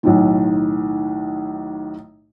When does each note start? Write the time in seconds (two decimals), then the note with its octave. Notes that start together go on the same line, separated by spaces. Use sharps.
0.03 B1 A2 D#3